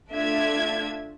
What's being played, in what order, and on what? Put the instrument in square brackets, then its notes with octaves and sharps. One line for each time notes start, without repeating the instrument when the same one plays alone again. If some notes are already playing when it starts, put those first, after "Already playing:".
[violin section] A3 D4 F4 E5 G#6